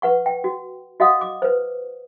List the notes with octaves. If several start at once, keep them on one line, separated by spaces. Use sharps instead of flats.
B4 F#5 C#6
G5
F#4
F#4 D#5 F5 F#5 D#6
D6
B4 C5